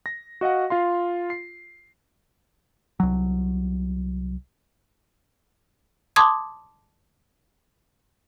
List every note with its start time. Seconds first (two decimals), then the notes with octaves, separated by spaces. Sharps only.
0.06 A#6
0.41 F#4 D#5 F5 F#5
0.70 F4 F5 C6
1.30 C7
3.00 C2 F#3
6.16 A5 C6 D6 D#6 G#6